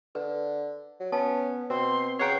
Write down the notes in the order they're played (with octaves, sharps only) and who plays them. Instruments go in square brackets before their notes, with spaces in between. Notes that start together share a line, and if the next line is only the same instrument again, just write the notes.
[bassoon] D3 [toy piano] B4
[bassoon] F#3
[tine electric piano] B3 [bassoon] C#4 [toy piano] A5
[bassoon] B2 [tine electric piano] C4 [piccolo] C6
[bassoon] C#3 [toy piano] B4 A#5 [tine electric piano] C#5 F#5 G5 [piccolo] C7